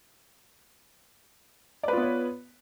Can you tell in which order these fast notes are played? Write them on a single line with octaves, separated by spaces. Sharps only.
D5 B4 F4 B3 C#5